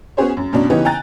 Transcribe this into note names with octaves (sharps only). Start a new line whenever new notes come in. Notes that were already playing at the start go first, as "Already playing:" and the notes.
B3 C#4 F#4 G#4 C5 C#5
F#2
F#2 B2 C#4 D4
C#3 E3 B3 C#4 D#4 G4
G5 G#5 A#5 F#6 A6